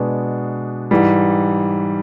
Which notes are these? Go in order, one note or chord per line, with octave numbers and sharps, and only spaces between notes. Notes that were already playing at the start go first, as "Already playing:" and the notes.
Already playing: B2 G#3 B3 D4
G#2 E3 G3